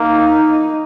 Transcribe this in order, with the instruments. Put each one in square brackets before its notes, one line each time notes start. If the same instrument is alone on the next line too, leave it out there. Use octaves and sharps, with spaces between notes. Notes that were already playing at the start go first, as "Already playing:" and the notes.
Already playing: [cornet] A#3 [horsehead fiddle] D#4